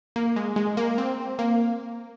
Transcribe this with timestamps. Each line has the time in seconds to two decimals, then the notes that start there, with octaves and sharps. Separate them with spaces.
0.16 A#3
0.36 G#3
0.56 G#3
0.77 A#3
0.98 C4
1.39 A#3